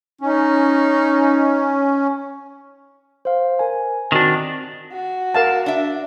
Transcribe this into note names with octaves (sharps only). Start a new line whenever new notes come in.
C#4 D#4
C5 F5
A#4 G#5
D#3 C4 D4 F#4
F#4
A#4 F5 A5
D4 E5